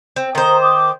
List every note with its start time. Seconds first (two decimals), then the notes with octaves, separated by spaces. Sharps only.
0.16 C4
0.35 D#3 C5 A#5 D#6
0.61 D6 D#6